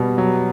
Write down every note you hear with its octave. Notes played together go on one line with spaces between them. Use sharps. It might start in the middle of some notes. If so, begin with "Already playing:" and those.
Already playing: B2 G3
F#3